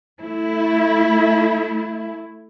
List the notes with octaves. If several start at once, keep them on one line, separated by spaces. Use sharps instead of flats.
A3 E4